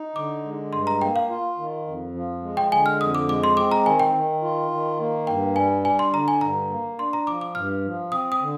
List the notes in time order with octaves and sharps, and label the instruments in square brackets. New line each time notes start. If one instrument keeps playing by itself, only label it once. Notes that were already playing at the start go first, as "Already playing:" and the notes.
Already playing: [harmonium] D#4
[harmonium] D3 [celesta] D6
[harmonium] G#3
[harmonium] G2 [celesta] C6
[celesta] A#5
[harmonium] A#3 [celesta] G5
[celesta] F5
[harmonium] F4
D#3
F2
F3
G#3
[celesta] G5
[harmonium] D3 [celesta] G#5
[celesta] F6
[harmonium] F2 [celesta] D#6
[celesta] D6
[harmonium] G#3 [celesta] D6
[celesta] C6
[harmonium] C4 [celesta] D6
[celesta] A#5
[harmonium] D#3 [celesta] G#5
[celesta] G5
[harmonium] D#3
F4
D#3
A#3
[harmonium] G2 [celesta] G5
[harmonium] G3 [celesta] G#5
[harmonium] D4 [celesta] G#5
[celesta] C6
[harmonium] D3 [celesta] A#5
[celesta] G#5
[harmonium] G2 [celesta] A#5
[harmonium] A#3
[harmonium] D4 [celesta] C6
[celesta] A#5
[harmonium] F3 [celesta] D6
[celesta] D6
[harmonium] G2 [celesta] F6
[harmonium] F3
[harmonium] C4 [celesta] D#6
[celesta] D#6
[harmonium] D3